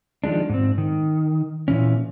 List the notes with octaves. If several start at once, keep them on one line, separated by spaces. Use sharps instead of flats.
D#3 F3 G#3 D4
G#2 C4
D#3
A#2 E3 C#4